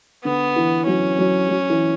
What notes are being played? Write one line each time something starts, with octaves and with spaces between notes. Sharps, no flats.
D3 B3
E3
F#3 C#4
F#3
F#3
E3